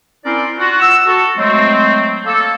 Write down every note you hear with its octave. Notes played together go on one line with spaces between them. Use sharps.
C4 C#4 E4 A#4 C5 D5
F4 F#4
F#5 E6
F#4 A4
F#3 G#3 A3 C4
A#3 A4